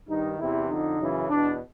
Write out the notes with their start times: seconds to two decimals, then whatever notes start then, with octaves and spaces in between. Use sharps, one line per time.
0.08 G2 D#3 D#4
0.39 E2 C3 E3 E4
0.68 F2 D3 D#4
0.98 F#2 C#3 E3
1.29 E2 B2 D4